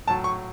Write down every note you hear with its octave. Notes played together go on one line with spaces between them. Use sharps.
A2 F#3 A5
C#6